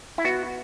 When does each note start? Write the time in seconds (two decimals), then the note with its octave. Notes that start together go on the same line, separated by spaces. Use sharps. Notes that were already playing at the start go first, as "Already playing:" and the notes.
0.18 E4
0.24 B3 F#4